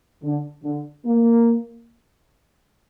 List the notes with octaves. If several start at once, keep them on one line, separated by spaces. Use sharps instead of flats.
D3
D3
A#3